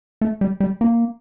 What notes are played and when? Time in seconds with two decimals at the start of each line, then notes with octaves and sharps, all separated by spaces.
0.21 A3
0.41 G3
0.60 G3
0.81 A#3